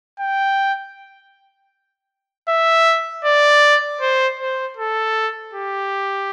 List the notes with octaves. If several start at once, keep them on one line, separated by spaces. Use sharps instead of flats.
G5
E5
D5
C5
C5
A4
G4